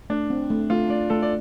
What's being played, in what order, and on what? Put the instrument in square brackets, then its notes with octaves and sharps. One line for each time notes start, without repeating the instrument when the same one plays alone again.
[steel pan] A3 [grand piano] D4
[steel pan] C4
A3
[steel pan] A3 [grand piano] F4
[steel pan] A3 [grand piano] D5
[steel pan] A3 [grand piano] A4
[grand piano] D5